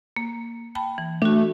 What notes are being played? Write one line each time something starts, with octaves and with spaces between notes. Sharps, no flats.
A#3
G5 A5 B5
E3
A3 D4 F#4